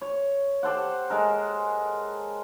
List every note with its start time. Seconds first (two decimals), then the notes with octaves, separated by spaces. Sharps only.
0.01 C#5
0.63 G4 A4 C5 F#5
1.10 G#3 A4 A#4